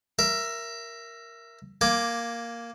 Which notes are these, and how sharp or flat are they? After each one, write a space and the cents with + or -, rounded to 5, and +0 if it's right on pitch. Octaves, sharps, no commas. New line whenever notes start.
A#4 +0 E5 +20
A#3 +0 G#5 +0 D6 +0